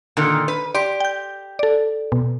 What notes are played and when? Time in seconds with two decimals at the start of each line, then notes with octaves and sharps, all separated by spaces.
0.17 A#2 D3 D#3
0.48 B4
0.75 G4 D5 C6 D7
1.00 G5 G6
1.59 A4 D5
2.12 B2